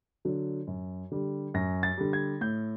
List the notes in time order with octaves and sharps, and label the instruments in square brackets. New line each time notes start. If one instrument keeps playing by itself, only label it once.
[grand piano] D3 F#3
F#2
D3 G3
F#2 A#6
A6
D3 G3
G#6
A2 G6